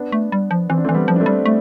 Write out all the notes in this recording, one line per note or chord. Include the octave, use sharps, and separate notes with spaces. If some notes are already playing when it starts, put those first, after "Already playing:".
Already playing: B3 D4
A3
G3
F3
E3 C4
D4
A3 C4
E3
G3 B3
F3
D4
A3 C4
G3
A3